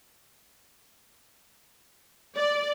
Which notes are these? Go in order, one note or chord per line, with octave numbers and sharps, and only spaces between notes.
D5